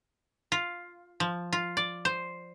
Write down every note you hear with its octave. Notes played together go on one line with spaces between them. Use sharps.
F4
F3
F4
D5
C5